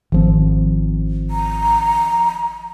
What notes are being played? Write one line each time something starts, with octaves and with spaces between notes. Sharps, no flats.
G#1 D#3 F3 C4
A#5